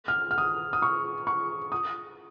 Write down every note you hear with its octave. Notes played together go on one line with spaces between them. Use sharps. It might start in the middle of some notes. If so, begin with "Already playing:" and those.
F6
F6
D#6
D#6
C#6
C#6
D#6